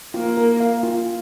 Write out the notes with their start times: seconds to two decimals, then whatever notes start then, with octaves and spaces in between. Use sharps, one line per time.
0.14 A#3 F4
0.37 A#4
0.60 F5
0.83 F4